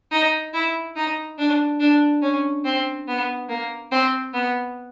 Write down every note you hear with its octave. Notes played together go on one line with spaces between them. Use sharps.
D#4
E4
D#4
D4
D4
C#4
C4
B3
A#3
C4
B3